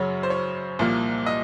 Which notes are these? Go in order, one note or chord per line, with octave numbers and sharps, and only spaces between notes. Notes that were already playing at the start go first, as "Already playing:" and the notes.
Already playing: F#2 C#3 F#3 C#5
C5
C#5
C2 A#2 F3 A#3
D#5